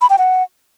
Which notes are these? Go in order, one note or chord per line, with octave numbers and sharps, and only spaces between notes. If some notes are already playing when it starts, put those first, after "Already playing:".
B5
G5
F#5